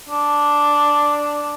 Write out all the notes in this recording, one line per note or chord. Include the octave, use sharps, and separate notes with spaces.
D4